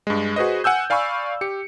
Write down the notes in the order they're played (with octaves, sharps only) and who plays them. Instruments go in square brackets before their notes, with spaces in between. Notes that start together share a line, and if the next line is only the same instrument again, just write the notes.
[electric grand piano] G2 G#3
F#4 G#4 B4 C5 D#5
F#5 G#5 E6 G6
D5 F5 G#5 B5 C#6
G4 C#7